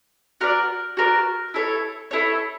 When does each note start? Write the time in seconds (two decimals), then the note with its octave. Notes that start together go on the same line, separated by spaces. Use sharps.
0.41 F#4 A#4 D5
0.97 F#4 A#4 D5
1.54 E4 A4 C#5
2.11 E4 A4 C#5